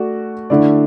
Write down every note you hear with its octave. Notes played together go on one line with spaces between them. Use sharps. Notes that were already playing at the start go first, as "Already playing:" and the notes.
Already playing: A3 F#4 D5
D3 A3 E4 D5